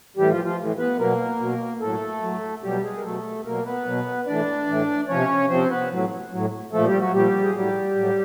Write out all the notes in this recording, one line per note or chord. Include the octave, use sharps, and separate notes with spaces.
A2 E3 G3 G4
F3 F4
F3 F4
A2 E3
B3 B4
B2 F#3 A#3 A#4
B2 F#3
A2 F#3 A3 A4
A2 F#3
B2 F#3 G3 G4
G#3 G#4
A#4
B2 F#3 A3 A4
B2 F#3 A#3 A#4
B3 B4
B2 F#3
A2 E3 D4 D5
A2 E3
C3 F3 C#4 C#5
C3 F3 C4 C5
B3 B4
A2 F#3
A2 F#3
A#2 F3 A3 A4
G3 G4
F#3 F#4
A#2 F3 G3 G4
G#4
A2 F#3 G3 G4
A2 F#3